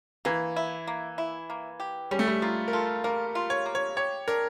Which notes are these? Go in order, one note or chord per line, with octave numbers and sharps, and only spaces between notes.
E3 A#3
E4
A#3
E4
A#3
G4
G3 C#4
A3
G3
A#3 F4
A#4
F4 A4
A#3 A#4
F4
C#5
A#3
C#5
G4 C#5
D4 A#4